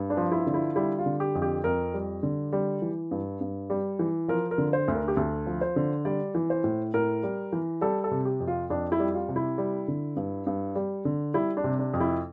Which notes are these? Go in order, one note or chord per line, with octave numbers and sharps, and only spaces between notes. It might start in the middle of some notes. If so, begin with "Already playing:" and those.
Already playing: G2
D4
F3
E4
D3
E4
G3 E4
F4
D3
G4
F2
G4
F2 A#4
G3
D3
G3
E3
G2
G2
G3
E3
F3 A#4
A#4
D3
C5
D2
A#4
G4
D2 A4
F3
C5
D3
G3 D5
E3
C5
A2
A2 A#4
G3
E3
G3 A4
A4
C3
G4
F2
F4
F2 D4
E4
G3
F4
C3
E4
G3
D3
G2
G2
G3
D3
G3 E4
D4
C3
D4
F2
E4